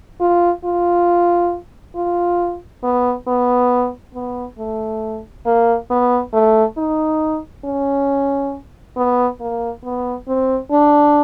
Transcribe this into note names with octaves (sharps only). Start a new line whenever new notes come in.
F4
F4
F4
B3
B3
B3
A3
A#3
B3
A3
D#4
C#4
B3
A#3
B3
C4
D4